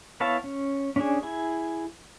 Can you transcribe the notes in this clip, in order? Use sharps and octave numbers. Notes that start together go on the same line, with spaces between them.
B3 E4 C#5 F5 A5
C#4
C#4 D4 G#4
E4 G#4